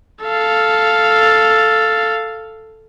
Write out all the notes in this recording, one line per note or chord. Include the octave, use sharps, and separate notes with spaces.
A4 F5